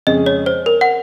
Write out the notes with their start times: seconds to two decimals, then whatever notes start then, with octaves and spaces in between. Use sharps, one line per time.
0.07 F2 C#3 G#3 C#4 G#4 D#5
0.26 C#5
0.46 C5
0.66 A#4
0.81 F#5